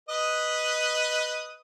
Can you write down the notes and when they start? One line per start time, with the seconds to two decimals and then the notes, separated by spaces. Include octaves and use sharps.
0.09 B4 D#5 D#6